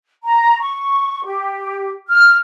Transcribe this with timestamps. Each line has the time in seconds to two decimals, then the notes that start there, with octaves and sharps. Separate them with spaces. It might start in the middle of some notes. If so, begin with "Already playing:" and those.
0.24 A#5
0.60 C#6
1.24 G4
2.08 F6